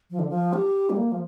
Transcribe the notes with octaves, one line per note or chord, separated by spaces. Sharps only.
F3
D3
F3
G4
G3
A#3
F3